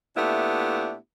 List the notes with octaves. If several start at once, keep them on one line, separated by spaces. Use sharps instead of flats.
A#2 A3 B3 D4 E4 G4